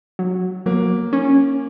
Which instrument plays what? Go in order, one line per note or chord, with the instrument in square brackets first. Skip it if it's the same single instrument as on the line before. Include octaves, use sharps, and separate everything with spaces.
[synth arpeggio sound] F#3
[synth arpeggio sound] F#3 [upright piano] A#3
[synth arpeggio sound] C#4